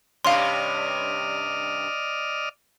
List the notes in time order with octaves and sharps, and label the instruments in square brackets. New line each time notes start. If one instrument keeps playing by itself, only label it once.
[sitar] G2 C3 C#4 [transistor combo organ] D5 D#5 F6 [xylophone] F5 C6